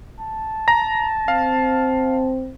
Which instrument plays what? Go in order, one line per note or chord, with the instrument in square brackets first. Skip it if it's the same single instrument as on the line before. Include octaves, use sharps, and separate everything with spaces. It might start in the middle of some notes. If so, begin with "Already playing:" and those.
[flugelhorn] A5
[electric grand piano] A#5 A#6
[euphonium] C4 [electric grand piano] F5